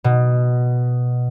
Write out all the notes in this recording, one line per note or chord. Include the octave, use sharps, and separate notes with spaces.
B2